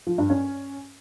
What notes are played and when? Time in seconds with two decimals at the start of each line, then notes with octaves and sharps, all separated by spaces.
0.07 F3
0.18 G2
0.30 C#4